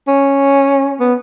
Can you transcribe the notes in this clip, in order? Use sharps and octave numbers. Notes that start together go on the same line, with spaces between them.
C#4
B3